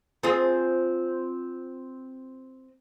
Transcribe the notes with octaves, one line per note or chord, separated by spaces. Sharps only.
C4 F4 G#4